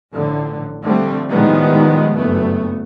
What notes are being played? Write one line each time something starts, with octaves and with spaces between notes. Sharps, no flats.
A1 A2 D3 F3
D3 F3 G3 A3 C4
A2 D#3 F3 G3 G#3 B3
F#1 G2 A3 B3